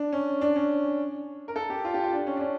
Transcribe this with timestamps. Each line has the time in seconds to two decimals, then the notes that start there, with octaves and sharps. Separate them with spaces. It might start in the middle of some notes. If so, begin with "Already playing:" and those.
Already playing: D4
0.13 C#4
0.41 D4
0.56 C#4
1.48 A#4
1.56 A4
1.70 G4
1.85 F4
1.94 G4
2.03 F4
2.13 D4
2.27 C#4
2.37 D4
2.41 C#4